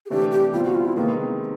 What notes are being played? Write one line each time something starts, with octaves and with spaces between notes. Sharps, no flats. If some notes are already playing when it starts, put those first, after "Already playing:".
G#4
C3 E3 A3 D4 G4
G4
B2 G3 C4 F4
F#4
F4
E4
C3 D#3 G#3 A#3 B3 D#4